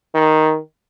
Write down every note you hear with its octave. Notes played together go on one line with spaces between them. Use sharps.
D#3